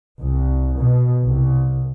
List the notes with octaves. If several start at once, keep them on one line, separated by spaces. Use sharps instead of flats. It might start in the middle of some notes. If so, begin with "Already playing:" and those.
C2
B2
C2